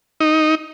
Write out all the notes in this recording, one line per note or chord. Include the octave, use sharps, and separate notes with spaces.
D#4